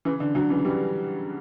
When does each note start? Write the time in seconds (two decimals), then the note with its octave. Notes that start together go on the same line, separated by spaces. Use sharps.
0.05 C#3 E3
0.20 D3
0.35 D3 F#3
0.50 C#3 E3
0.65 E3 G3